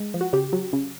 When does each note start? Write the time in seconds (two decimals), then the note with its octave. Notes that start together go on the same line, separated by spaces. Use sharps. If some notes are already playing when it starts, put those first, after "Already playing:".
Already playing: G#3
0.14 F3
0.21 F#4
0.33 C#3 G4
0.53 F#3
0.73 C#3